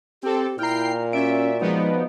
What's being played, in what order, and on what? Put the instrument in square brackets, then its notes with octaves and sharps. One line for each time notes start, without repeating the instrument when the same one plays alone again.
[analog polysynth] C4 A4 [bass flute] G4
[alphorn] A#2 [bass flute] E4 [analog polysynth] G5 C7 [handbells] A#5 F6
[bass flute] C#4 [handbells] F#4 D5 D7 [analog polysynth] E5
[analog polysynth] F3 B3 D#4 [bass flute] G#3